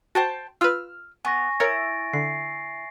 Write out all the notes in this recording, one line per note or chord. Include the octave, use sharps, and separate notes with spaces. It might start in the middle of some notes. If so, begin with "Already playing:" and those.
F#4 C5 G5 A5
F4 B4 E6 F6
B3 G#5 C#6 A#6
E4 A#4 C#5 A6 A#6 D7
D3 C7